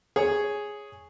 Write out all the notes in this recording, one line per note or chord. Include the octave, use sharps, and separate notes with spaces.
G#4 C#5